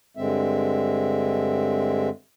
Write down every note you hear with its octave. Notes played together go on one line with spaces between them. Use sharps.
G2 D3 G#3 C4 E5